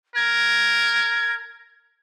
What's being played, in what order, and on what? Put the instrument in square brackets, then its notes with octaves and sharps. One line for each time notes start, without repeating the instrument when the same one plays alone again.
[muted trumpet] A#4 [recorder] G#6